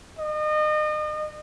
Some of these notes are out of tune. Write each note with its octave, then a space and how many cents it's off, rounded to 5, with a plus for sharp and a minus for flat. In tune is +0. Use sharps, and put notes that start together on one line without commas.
D#5 -35